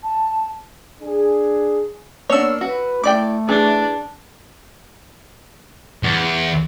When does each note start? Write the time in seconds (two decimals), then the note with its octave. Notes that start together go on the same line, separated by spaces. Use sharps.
0.04 A5
1.01 D4 G#4
2.30 A#3 B3 D4 C#5 E6
2.61 F#4 B4
3.04 A3 E4 D5 G5 D6
3.49 E3 D4 G#4
6.03 E2